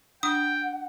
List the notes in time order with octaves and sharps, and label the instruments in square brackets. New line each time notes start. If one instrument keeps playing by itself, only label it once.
[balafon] D4 [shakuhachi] F#5 [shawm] G5 [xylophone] D#6